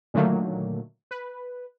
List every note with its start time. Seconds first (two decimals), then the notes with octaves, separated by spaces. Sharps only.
0.14 A#2 D3 D#3 F#3 A3 A#3
1.11 B4